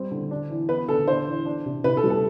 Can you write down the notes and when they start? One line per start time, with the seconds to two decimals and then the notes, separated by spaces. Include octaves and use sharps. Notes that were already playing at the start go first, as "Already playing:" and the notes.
Already playing: G3 C4
0.11 D3
0.31 D4
0.50 E3
0.69 B3 B4
0.88 D3 A4
1.07 D4 C5
1.27 E3
1.46 D4
1.66 C3
1.84 C3 B4
1.97 A4
2.04 G3
2.10 A4